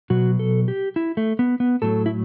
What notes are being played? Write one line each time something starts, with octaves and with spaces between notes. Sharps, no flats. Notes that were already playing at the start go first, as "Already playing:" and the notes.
B2 F#3 F#4
A4
G4
E4
A3
B3
B3
A2 F#3 A4
E4